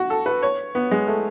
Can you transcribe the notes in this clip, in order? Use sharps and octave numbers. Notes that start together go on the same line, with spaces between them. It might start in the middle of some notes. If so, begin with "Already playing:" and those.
Already playing: F#4
A4
B4
C#5
B3
G#3
A3